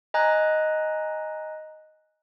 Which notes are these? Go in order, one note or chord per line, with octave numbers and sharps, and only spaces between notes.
D#5 G#5 A#5 F#6